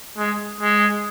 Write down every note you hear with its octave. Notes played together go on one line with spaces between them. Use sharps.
G#3
G#3